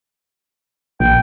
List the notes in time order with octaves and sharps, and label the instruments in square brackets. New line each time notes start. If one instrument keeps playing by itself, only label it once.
[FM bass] A#1 [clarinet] G5